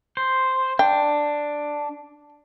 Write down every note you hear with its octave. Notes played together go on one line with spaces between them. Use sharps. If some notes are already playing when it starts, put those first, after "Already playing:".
C5
D4 G5